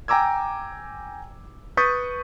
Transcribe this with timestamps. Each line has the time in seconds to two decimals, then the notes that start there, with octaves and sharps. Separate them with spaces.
0.08 G5 G#5 A#5 D6 E6 G#6
1.77 B4 C#6 D#6 G6 A6 B6